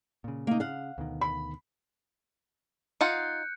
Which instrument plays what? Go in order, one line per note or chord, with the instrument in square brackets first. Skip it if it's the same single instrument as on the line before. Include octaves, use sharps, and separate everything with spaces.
[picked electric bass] A#2 C#3
[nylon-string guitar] A#3 D#4
[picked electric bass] C#3 [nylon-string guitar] F5 F#5
[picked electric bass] D2 B2 D#3
[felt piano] B5
[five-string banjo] D#4 F4 F#5 [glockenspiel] F#6 G6 C#7